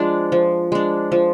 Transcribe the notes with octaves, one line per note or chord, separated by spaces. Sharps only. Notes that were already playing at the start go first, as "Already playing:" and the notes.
Already playing: F3 G#3 D4
F3
G#3 D4
F3